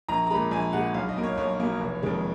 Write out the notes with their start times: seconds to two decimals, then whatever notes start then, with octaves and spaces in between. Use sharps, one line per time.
0.09 A#1 A#5
0.27 A#5
0.30 A#2 G#3 B5
0.51 A#1 G#5
0.73 A#2 G#3 F#5
0.94 B1 F5
1.09 D#5
1.16 B2 A#3
1.23 C#5
1.38 B1 C#5
1.60 B2 A#3
1.80 F1
2.03 F2 D#3 G#3